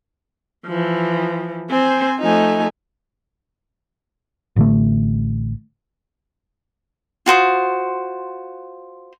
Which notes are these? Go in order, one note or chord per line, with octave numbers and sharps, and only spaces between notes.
E3 F3
C4 C5 G#5
F3 A3 D#4 G#5
A1 D3 A3
F4 F#4 C5 D#6